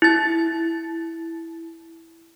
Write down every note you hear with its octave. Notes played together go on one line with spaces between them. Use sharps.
E4 A6